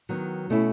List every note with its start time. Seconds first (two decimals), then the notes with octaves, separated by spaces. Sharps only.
0.09 D#3 F#3 B3
0.50 B2 A3 C#4 E4